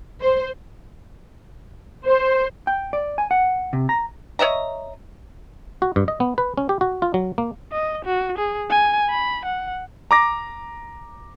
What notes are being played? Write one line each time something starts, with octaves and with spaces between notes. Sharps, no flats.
C5
C5
G5
D5
G#5
F#5
C3
A#5
C#5 D#5 E5 A#5
F#4
G2
D#5
B3
B4
C#4
G4
F#4
F4
F#3
A#3
D#5
F#4
G#4
G#5
B5
F#5
A#5 D6 A#6